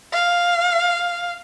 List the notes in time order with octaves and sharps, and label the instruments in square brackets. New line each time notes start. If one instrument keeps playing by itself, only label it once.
[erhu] F5